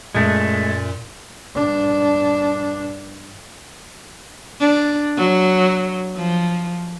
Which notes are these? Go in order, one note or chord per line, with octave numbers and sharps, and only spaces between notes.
F#2 A#2 G#3 A3
G2 D4
D4
F#3
F3